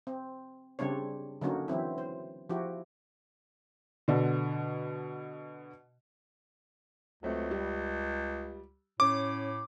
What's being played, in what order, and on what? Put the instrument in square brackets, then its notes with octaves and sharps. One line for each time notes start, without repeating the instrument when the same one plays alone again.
[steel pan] C4
C#3 G3 C4 D4 C#5
D3 F#3 A#3 C#4 D#4 F#4
E3 F#3 C4 E4
C5
F3 E4 F#4 G4
[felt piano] B2 D3
[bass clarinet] C#2 [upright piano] F#3 A3 C4
[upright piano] G3
[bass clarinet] A2 [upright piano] C#4 [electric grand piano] D6